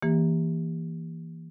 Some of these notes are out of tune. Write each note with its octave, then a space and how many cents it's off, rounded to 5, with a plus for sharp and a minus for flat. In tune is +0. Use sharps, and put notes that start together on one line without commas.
E3 +0 A#3 +0 G4 +10